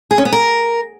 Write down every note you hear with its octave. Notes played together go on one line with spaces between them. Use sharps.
G#4
C#4
B3
A#4